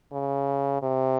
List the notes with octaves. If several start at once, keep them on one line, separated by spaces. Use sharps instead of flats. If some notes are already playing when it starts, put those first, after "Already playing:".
C#3
C3